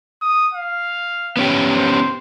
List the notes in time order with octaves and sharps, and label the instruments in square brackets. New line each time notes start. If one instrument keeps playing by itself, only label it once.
[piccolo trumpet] D#6
F5
[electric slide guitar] B3 C#4 G4
[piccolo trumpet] C5